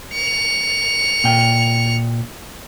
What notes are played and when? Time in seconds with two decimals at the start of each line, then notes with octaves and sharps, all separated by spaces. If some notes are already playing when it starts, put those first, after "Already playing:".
0.13 C#7 F7
1.24 A#2 G5